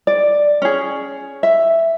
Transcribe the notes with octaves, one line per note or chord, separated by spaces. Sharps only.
D5
C#4 G#4
E5